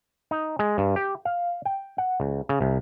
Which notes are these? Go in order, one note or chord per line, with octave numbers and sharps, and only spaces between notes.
D#4
G#3
G2
G4
F5
G5
F#5
C#2
C#3
C2